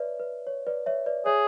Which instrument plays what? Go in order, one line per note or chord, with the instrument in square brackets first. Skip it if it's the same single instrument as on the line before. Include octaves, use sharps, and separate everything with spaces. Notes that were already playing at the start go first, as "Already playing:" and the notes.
Already playing: [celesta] B4 C#5 D5 E5
B4
C#5
B4 D5
C#5 E5
B4 D5
[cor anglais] G#4 [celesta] C#5 E5